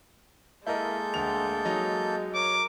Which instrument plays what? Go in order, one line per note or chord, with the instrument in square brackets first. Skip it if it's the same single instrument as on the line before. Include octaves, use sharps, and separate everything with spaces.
[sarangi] G#3 [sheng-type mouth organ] A#3 A4 G6 [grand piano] E4 A#4 D#5
[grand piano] D2 F7
F#3 D#4
[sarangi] A#4 [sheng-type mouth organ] C#5 [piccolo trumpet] D6